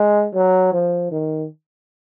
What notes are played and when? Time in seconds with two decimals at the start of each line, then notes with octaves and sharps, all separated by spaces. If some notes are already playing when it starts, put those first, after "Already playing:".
Already playing: G#3
0.35 F#3
0.73 F3
1.12 D#3